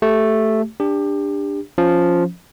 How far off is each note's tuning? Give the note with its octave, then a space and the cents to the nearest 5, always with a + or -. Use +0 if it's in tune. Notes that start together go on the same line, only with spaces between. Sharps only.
A3 +0 G4 +0
D4 +0 G4 +25
F3 +0 C#4 +0